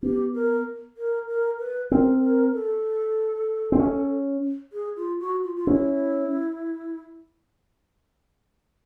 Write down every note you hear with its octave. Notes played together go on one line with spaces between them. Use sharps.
B3 G4
A#4
A#4
A#4
B4
C4 A#4
A#4
A4
C4
C#4
G#4
F4
F#4
F4
F4
C#4 E4